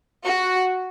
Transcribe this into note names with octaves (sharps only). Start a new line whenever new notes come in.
F#4